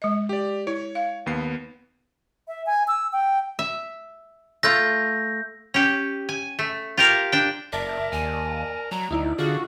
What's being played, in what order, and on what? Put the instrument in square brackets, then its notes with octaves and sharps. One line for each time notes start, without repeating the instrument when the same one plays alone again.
[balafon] G#3 D#5
[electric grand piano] G4 D5
[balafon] E4 [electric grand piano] C#5
[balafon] F5
[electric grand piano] D#2 B3 C7
[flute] E5
G#5
E6
G5
[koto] E5
[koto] A3 F4 [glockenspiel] G6 A#6
[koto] C#4 G4
G#5
A3
F4 G4 A#4 F5
D4 G5
[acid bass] F#1 [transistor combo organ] A#4 [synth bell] D5 A5 [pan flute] E5
[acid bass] D#2 [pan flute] G#5
[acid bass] F#3 [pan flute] A#5
[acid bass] D2 [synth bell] D#4 E4 D5
[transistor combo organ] D3 [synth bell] F4 [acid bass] F#4 [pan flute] G#4